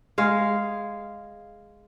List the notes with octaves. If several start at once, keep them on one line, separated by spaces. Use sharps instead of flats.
G#3 F5